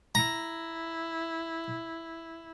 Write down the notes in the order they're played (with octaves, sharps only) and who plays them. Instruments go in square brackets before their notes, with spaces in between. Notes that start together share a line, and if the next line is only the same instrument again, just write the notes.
[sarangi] E4 [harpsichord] A#5